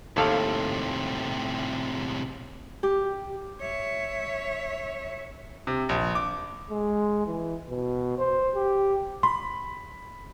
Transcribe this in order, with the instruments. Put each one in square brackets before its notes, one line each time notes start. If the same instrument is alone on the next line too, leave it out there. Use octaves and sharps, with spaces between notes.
[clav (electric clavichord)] D#2 A4 F5 [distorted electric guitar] A2 C3
[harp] G4
[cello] C#5 E5
[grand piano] C3
A#1
D6
[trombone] G#3
E3
B2
C5
G4
[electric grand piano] B5 [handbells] C6